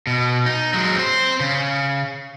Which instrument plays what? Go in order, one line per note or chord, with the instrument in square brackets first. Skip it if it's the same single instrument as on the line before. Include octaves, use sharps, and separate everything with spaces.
[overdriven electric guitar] B2
D#4
F#3 G#3
C4 C5
C#3